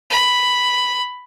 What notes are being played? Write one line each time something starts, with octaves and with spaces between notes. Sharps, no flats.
B5